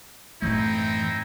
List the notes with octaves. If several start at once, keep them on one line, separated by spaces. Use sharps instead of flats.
F#2 A2 E3 A3 C4 D#4 E4